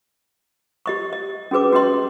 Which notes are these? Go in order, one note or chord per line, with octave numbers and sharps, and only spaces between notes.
G4 D#5 C#6
D#5
C#4 F#4 G#4 B4 D6
C#4 F#4 G4 B4 D#5 C6